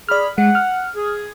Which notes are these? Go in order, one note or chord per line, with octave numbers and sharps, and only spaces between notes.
G#4 D5 B5 F6
G#3 F#5
F6
G#4